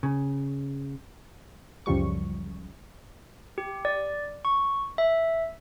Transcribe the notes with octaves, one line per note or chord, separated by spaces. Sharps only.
C#3
C#2 F#2 C#3 F3 G3 C#6
G4
D5
C#6
E5